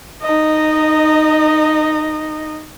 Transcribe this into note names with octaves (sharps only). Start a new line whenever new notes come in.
D#4 D#5